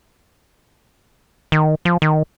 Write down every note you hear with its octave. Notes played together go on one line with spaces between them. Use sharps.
D#3
F3
D#3